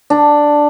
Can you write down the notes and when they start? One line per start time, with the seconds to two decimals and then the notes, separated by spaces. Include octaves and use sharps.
0.10 D4